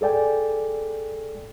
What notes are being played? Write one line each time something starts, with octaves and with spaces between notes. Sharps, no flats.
G#4 A4 D5 G5 G#5